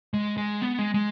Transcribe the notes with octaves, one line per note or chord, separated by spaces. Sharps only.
G#3
G#3
B3
G#3
G#3